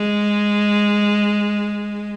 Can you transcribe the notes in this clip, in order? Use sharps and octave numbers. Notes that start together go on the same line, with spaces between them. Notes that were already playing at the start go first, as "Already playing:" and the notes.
Already playing: G#3